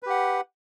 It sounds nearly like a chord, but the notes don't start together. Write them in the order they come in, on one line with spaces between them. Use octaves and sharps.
B4 G4 F#5